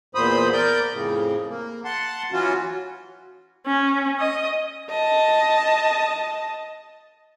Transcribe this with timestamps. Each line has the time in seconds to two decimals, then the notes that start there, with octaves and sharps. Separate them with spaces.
0.15 E2 A#2 C5 B5 D#6
0.53 A#4 D5 G6
0.92 F2 A2 C#3
1.48 A#3
1.85 F#5 A5 C6
2.32 E3 F#3 C#4 F4 F#4
3.66 C#4
4.20 D#5
4.90 D#5 A5